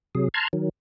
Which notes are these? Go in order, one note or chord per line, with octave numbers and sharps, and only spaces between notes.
C3 F#3 G#4
A5 A#5 C6 F6 F#6 G#6
D#3 F#3